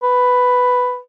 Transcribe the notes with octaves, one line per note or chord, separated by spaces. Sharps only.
B4